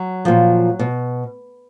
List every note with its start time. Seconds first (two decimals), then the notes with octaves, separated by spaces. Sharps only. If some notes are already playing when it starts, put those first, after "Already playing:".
Already playing: F#3
0.25 A#2 F3
0.79 B2